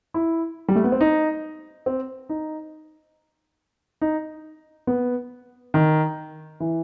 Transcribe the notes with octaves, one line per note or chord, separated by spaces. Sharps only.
E4
G3
A3
B3
C4
D#4
C4
D#4
D#4
B3
D#3
E3